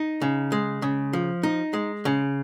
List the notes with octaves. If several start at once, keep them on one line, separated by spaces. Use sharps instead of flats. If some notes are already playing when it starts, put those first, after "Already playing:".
Already playing: D#4
C#3
G#3
C#3
F3
D#4
G#3
C#3